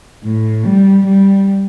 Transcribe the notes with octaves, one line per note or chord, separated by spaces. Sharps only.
A2
G3
G3